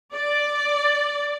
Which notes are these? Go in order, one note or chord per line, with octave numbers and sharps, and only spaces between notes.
D5